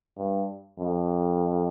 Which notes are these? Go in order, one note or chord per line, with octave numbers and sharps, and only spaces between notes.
G2
F2